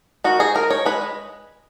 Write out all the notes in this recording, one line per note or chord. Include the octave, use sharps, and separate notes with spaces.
D#3 F#4
D#4 G#4
D#3 A#4
D#4 C#5
G#3 B4
G#3